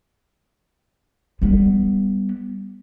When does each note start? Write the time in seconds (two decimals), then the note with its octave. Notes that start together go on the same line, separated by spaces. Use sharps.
1.42 G3 B3